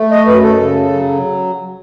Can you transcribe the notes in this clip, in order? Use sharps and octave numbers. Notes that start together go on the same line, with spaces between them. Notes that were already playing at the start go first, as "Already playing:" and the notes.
Already playing: A3
D#5
F#2 B4
A4
C#3
F#3